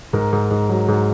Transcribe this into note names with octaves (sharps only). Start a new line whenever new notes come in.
G#2 A#4
G#2
G#2
F#3
G#2